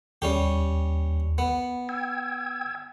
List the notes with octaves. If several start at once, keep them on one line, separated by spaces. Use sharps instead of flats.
D#2 G3 C#4 G4
B3
G5 E6 G#6